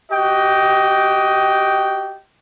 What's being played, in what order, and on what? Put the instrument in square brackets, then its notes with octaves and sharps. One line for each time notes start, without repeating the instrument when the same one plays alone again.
[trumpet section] F#4 G4 D#5 G5